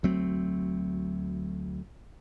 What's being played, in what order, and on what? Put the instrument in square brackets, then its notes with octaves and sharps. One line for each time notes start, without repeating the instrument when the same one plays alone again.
[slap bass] D2 F#3 A3 C4